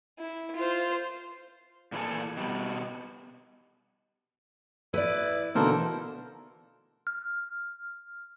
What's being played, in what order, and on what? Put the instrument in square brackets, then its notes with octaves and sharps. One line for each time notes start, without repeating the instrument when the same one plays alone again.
[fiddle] E4
F4 C5
[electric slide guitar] A#2 E3 D#4 E4 G#4 A4
B2 G3
[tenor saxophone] E4 [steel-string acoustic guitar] B4 D5
[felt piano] B2 D3 E3 [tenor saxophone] A#3 [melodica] A4 A#4 C5
[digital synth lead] F6